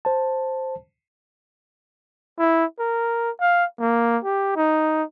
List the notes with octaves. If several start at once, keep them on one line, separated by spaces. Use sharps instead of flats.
C5 A5
E4
A#4
F5
A#3
G4
D#4